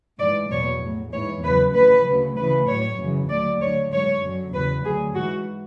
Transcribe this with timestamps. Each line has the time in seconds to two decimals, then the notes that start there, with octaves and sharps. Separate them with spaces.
0.20 G#2 E3 D5
0.51 E2 B2 F#3 C#5
0.81 A2 F#3
1.13 G#2 E3 C#5
1.44 E2 C#3 F#3 B4
1.74 D2 C#3 E3 B4
2.06 D2 C#3 F#3
2.37 D2 C#3 E3 B4
2.68 A2 F#3 C#5
2.98 F#2 C#3 E3
3.29 D2 D3 F#3 D5
3.61 D2 D3 F#3 C#5
3.92 G#2 F#3 C#5
4.23 F#2 D3 F#3
4.53 E2 C#3 F#3 B4
4.84 D2 D3 F#3 G#4
5.15 G#2 E3 F#4